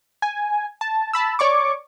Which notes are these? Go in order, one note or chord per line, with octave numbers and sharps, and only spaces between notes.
G#5
A5
A5 B5 E6
C#5 D5 C#6 D6